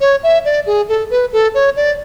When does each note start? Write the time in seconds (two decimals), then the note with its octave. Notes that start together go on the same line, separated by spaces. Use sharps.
0.01 C#5
0.23 E5
0.45 D5
0.67 G#4
0.89 A4
1.10 B4
1.33 A4
1.54 C#5
1.76 D5